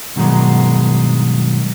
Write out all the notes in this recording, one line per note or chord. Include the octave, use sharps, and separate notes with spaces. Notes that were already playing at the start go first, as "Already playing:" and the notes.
G2 B2 D#3 F#3 G#3